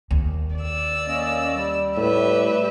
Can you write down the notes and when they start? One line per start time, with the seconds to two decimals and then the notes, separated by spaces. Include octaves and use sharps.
0.11 D#2
0.57 D5 E6
1.07 A#3 C#4 D#5
1.54 G3
1.97 A2 G4 B4 E5